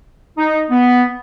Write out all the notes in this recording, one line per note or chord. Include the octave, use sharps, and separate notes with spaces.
D#4
B3